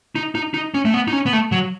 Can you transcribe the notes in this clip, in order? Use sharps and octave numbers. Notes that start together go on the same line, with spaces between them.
D#4
D#4
D#4
C#4
A3
B3
D#4
C#4
B3
A3
F#3